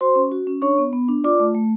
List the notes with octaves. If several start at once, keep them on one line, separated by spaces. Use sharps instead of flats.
F#4 C5 C6
C#4
F#4
C#4
D4 C#5 C#6
B3
B3
D4
F4 D5 D6
A3
A3